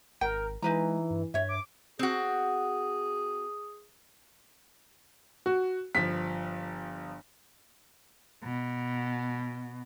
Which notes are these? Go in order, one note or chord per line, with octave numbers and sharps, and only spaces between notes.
G#1 A#4 G5
E3 G#3 D#4 B4 A#5
G2
G2 C#5 E5
D6
C4 F#4 G#4
F#4
G1 F3 B6
B2